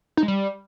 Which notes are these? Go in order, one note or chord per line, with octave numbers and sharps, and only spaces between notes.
D#4
G#3
G3